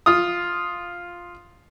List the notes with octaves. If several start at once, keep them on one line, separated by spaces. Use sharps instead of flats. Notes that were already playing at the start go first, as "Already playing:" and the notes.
F4 D#6